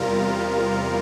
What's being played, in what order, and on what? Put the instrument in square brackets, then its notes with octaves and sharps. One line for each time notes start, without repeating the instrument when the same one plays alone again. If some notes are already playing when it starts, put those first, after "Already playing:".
Already playing: [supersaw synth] E2 C3 G3 F4 A#4